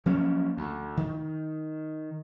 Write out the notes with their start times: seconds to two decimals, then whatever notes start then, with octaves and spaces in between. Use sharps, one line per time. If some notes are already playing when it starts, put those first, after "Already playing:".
0.06 F3 F#3 A#3 C#4
0.57 D2
0.97 D#3